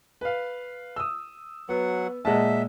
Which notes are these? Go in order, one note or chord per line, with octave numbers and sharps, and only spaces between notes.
B4 F5
D#6 E6
F#3 B3 F#5
A#2 G#3 D#5 E5 F#5 A5